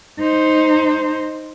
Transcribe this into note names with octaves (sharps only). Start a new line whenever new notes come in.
D#4 C5